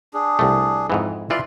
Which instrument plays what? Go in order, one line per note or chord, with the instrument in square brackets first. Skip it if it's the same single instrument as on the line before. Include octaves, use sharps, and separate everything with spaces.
[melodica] D4 G#4
[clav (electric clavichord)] C2 A3
F2 G#2 E3
[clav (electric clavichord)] E3 F4 D5 [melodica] E5 C6